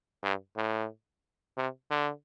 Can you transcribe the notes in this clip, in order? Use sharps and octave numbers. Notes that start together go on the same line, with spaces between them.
G2
A2
C3
D3